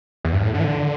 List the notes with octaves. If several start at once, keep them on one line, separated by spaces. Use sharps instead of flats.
E2
G2
A2
D3
E3
D3